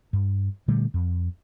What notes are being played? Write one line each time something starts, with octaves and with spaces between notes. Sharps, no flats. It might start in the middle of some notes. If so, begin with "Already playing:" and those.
G2
A#2 D3 G3 A3
F2